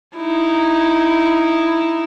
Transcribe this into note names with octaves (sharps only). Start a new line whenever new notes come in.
D#4 E4